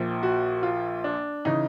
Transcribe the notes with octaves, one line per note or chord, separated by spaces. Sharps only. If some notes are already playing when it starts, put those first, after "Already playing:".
Already playing: A#1 A#2 F3
F#4
F4
D4
C#3 E3 D#4